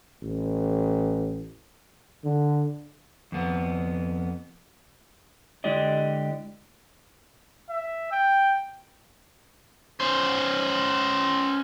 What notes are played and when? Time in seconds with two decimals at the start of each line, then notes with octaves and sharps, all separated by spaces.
0.22 A1
2.24 D3
3.32 F2 B3
5.64 D3 G#3 E4 G4 D5 D#5
7.70 E5
8.11 G5
10.00 C#4 C5